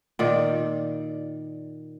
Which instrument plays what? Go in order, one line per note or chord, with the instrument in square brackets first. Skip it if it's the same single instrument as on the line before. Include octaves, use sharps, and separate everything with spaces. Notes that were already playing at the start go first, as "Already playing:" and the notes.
[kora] A#2 D#3 D5